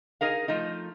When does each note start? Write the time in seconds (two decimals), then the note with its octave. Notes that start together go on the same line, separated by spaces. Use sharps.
0.21 D#4 G#4 A#4 F5
0.48 F3 A3 D#4